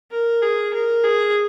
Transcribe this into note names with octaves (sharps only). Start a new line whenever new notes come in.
A#4
G#4
A#4
G#4